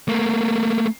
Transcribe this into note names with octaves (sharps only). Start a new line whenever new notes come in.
A3 A#3